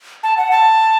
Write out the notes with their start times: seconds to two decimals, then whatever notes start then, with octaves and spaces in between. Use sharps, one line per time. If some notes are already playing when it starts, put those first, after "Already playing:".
0.23 A5
0.38 F#5
0.51 A5